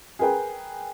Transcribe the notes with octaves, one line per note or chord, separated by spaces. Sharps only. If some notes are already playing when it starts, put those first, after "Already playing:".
G#4 A#4 B4 G5